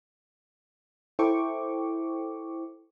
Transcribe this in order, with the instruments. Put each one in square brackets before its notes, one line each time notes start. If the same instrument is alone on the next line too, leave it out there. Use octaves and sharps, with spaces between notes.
[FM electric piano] E4 A4 C5 G5 C#6 D6